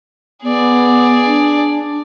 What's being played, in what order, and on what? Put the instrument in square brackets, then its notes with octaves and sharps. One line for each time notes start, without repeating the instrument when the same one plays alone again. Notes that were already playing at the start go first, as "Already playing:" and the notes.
[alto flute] B3 [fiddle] G#4 D5
[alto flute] D4